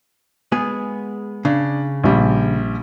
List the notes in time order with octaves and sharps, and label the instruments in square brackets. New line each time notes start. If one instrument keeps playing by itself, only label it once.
[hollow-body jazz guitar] G#3 B3 G#4
[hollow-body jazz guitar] C#3 [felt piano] D4
[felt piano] A#1 G3